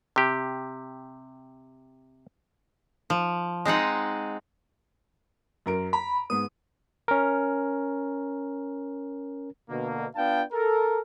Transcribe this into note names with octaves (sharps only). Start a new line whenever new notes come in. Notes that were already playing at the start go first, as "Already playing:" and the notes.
C3 G4
F3
G#3 C4 D#4 F#5
F#2 A#4 D7
A#5 B5
G#2 B3 D#6
C#4 A#4
B2 D3 A#3
B3 D4 F4 F5 G5 A5
A4 A#4